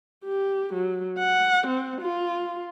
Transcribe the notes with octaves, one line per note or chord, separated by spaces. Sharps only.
G4
F#3
F#5
C4
F4